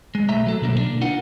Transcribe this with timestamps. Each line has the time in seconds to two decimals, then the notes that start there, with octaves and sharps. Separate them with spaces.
0.15 G#3
0.29 B1 A3 E5 A#5
0.46 F#3 A4
0.62 B2 D3 A#3
0.78 D4
1.01 D#4 F4 A#4 F#5